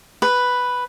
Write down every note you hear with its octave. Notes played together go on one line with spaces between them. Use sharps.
B4